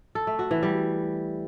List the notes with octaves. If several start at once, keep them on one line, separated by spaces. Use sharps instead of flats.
A4
A3
F#4
E3
G3